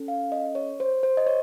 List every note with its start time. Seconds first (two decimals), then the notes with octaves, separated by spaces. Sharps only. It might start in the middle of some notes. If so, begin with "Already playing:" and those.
Already playing: C#4 A4
0.08 F5
0.32 D#5
0.55 C#5
0.80 C5
1.03 C5
1.17 D#5
1.27 C#5